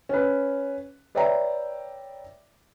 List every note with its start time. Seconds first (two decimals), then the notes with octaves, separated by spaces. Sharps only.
0.09 C#4 B4
1.15 B4 C#5 D5 E5 G5 A#5